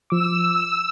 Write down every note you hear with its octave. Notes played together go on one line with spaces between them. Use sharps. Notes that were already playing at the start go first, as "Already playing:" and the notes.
F3 D6 E6